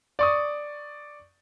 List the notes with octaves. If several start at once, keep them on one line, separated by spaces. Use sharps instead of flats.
D5 C#6 D#6